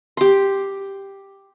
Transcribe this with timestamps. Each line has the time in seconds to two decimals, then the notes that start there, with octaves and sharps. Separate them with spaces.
0.17 G4 C6